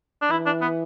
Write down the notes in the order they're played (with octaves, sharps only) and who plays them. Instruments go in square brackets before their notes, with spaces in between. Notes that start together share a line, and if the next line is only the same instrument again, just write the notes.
[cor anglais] D4
[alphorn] E3 [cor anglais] E4
[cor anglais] D4
B3